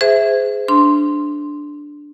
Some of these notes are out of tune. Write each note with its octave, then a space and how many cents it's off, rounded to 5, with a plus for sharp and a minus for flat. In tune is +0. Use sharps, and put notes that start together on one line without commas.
G#4 +0 C5 -30 E5 +0
D4 +0 C6 +0